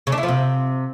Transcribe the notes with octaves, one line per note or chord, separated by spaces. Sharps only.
C#3
D4
E4
F3
C3